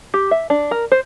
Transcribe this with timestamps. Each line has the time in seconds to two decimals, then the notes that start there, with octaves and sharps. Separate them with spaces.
0.14 G4
0.31 E5
0.50 D4
0.71 A#4
0.92 C5